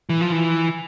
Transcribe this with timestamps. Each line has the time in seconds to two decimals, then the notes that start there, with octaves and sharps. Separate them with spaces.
0.09 E3
0.21 F3
0.32 E3